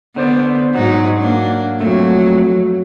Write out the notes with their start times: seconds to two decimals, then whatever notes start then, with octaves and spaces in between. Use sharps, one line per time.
0.16 D3 B3 C5 D5
0.75 G#2 F#3 D#4 F#4
1.19 A#3 D4
1.80 F2 A#2 F#3 A3